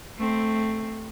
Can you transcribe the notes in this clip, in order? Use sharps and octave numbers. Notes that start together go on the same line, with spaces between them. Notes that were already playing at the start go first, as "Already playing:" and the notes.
A3 C4